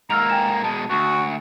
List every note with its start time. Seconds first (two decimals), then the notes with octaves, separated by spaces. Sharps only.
0.10 G#2 A#3 A#5 E6 F6 F7
0.29 G5 G#5 E7
0.64 B2 G#3 A5
0.90 D2 F#4